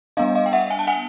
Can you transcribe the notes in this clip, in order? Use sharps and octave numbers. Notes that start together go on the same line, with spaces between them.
G3 B3 D4 D#5 F5
D#5 F5
G5
E5 F#5
G#5
A5
F#5 G#5